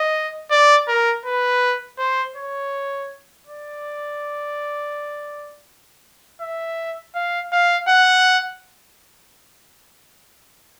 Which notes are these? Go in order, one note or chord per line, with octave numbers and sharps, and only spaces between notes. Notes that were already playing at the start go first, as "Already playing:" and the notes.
Already playing: D#5
D5
A#4
B4
C5
C#5
D5
E5
F5
F5
F#5